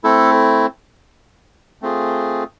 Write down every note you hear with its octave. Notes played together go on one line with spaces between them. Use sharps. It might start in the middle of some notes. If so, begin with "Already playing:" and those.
A3 C4 E4 A4
A3 C4 F4 G#4